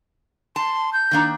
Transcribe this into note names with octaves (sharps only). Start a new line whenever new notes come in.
A5 C6
G6
D#3 A#3 D4